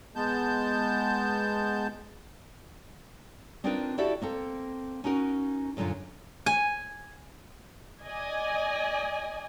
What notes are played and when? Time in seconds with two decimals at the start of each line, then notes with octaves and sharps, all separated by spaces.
0.16 G#3 B3 A5 G6
3.64 C4 D4 D#4 F4 A#4 B4
3.98 E4 F#4 G4 A4 D5 E5
4.21 A#3 C4 A4
5.04 C#4 D#4 F#4 A#4
5.77 F#2 A#2 D3 C#4 F4
6.46 G#5
8.03 D5 D#5 G#5